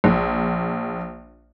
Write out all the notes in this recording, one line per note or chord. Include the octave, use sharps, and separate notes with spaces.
A#1